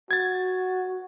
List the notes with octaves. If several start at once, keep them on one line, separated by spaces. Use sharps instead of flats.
F#4 G#6 A6